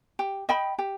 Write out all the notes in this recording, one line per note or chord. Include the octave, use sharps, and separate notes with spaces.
G4
D#5 G5 B5
G4